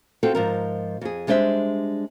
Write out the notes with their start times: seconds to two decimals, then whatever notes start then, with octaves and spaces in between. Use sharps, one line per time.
0.23 C4 F4 F#4 A4
0.35 G#2 F3 A#4
1.01 F2 G#4
1.27 G3 G#3 D4 C5 D#5 E5